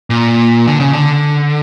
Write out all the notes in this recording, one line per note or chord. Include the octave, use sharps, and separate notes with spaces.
A#2
D3
C#3
D3